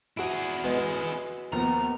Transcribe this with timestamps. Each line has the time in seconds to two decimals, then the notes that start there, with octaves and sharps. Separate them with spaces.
0.17 E4 F#4 G#4 D7
0.64 G#3 B3
1.52 D#2 F3 B3 A#5